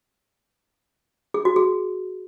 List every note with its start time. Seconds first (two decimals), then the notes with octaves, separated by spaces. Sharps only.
1.34 G#4
1.45 F#4
1.56 G#4